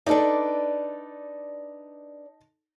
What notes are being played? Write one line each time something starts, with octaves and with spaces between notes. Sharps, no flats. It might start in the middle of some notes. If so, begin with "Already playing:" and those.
D4 D#4 A4 B4 D5